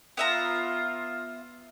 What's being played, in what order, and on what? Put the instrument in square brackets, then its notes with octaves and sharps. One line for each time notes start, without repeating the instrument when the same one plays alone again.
[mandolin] B3 E5 A#5 [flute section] F4